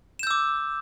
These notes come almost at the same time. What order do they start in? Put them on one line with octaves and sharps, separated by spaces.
E7 G6 E6 D6